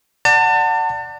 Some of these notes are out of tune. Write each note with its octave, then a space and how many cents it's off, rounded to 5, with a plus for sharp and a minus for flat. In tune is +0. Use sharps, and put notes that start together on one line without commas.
D5 +0 F#5 +0 A5 +35